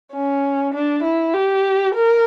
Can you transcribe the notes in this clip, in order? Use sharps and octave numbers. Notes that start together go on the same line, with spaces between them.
C#4
D4
E4
G4
A#4